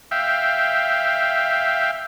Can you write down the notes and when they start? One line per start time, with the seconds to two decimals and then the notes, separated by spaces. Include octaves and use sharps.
0.11 E5 F5 G5